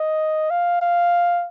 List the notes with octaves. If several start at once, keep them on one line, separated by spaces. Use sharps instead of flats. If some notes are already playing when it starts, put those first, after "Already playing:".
Already playing: D#5
F5
F5